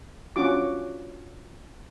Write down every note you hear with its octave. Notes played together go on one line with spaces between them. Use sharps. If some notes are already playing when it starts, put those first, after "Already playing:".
C#4 D4 F4 F#4 D6